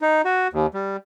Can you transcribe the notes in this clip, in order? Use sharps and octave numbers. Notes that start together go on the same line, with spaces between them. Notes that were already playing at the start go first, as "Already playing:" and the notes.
D#4
F#4
D#2
G3